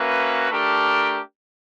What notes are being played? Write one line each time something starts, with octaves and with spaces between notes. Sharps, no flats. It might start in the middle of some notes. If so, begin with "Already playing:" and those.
Already playing: A#3 C#4 F#4 B4 E5
A3 D4 G4 A#4